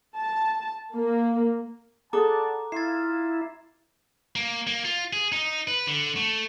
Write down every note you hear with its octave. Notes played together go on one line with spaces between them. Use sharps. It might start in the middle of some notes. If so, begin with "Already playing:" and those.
A5
A#3
G#4 A4 D5 F#5 A5 A#5 D6
E4 F4 A6 C7
A#3
A#3
F4
G#4
D#4
B4
D3
A3